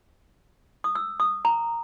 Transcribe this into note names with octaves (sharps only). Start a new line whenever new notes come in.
D#6
E6
D#6
A#5